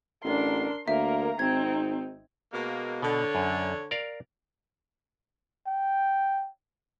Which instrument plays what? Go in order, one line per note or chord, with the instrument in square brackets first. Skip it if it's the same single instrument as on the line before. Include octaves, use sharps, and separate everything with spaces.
[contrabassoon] A1 [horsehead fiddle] D4 A#4 [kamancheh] C6
[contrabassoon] D2 [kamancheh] A#3 A#4 [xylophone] E5 [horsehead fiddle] A#5
[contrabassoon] G#1 [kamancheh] C4 D#4 [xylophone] G#6
[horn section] B2 G#3 A#3
[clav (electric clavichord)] B2 [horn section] D3 C#5
[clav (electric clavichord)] F#2
A#4 D5 F5
[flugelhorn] G5